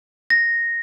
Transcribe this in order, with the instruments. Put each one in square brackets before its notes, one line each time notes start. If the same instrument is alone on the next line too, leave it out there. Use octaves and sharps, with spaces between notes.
[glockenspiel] A#6